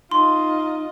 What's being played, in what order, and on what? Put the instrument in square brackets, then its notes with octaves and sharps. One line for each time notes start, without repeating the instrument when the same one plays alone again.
[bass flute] D#4 [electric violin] F4 D#5 [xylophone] C6